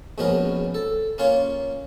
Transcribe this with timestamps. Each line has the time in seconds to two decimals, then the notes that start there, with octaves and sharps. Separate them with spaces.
0.18 A#1 G#2 B2 B3 C#4 A#4
0.75 A4
1.18 A#3 C#4 F4 C#5